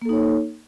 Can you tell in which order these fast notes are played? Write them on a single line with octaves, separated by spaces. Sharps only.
A#3 A4 D#4 C#5